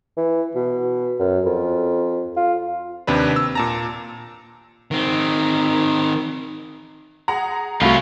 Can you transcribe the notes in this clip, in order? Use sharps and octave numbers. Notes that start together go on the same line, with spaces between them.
E3
B2
F#2
F2
F4
D#2 C3 D4 B4
E6
A#2 A5 A#5
D#3 C4
G#4 F#5 A#5
C2 A3 C#4 F4 F#4 F5 B5